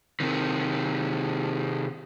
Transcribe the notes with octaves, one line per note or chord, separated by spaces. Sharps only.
C3 D#3